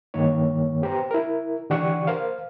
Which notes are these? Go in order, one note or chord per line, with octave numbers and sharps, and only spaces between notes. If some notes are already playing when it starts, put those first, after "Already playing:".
G2 D#3 A#3 C#5
B3 G4 C5 A#5
E4 A#4
D3 E3 G4 D5 F#5 C#6
A#4 C5 F5